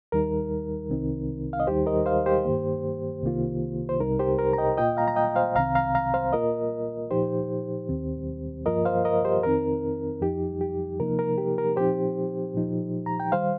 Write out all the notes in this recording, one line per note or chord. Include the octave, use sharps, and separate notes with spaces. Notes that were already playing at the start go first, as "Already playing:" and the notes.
D#2 D#3 G3 D#4 A#4
C2 C3 D#3 C4 D#4
F5
D#5
D#2 D#3 G3 D#4 G4 C5
A#4 D#5
C5 F5
G4 C5
G2 D#3 A#3
C2 C3 D#3 A#3 F4
C5
C2 C3 G3 D#4 A#4
G4 C5
A#4
A#5
D#5 G5
A#2 A#3 F4 D#5 G5
F5 A#5
A#5
D#5 G5
C5 F5
C2 C3 D#3 C4 F5 A#5
F5 A#5
F5 A#5
C5 F5
A#2 A#3 F4 A#4 D#5
A#2 F3 D#4 G4 C5
D#2 D#3 C4
G2 F3 A#3 F4 A#4 D#5
C5 F5
A#4 D#5
G4 C5
F2 D#3 C4 D#4 A#4
F2 F3 D#4 G4
G4
C3 F3 A#3 D#4 A#4
A#4
G4
A#4
A#2 F3 C4 D#4 G4 C5
A#2 F3 D#4
A#5
G5
D#3 G3 C5 F5